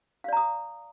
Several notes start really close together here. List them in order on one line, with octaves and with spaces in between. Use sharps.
F5 D5 A#5 D#6